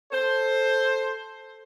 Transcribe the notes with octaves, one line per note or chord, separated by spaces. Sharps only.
A4 C5